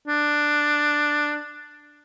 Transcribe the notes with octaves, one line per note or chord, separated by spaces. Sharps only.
D4